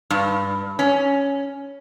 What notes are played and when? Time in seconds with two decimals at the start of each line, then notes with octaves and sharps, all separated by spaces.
0.11 G2
0.79 C#4